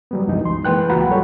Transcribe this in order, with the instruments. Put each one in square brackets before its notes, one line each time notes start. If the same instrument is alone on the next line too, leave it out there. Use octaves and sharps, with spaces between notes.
[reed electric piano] F#3 G3 B3
C2 F#2 E3 F3 G#3 D#4
C6
E3 G#3 A#3 B4 G5 F#6
C#2 F4 F#4 F#5 A#5 B5
F#3 G3 A4 C#5